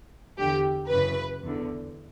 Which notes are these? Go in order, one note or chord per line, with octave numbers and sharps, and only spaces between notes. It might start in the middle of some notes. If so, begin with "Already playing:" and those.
E2 D3 G4
F#2 C#3 E3 B4
E2 D3